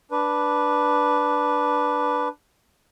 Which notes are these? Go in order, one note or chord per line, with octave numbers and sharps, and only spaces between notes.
D4 B4